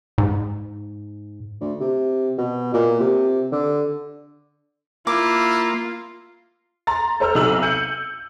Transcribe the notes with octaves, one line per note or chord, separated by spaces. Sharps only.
G#2
D2
C3
B2
A#2
C3
D3
A#3 E4 F4 D6
A#5 C6 A6
A4 C5 A#5 E6 F6
B1 C3 D#4 A4 E6 F#7
G6 C#7 D#7 F#7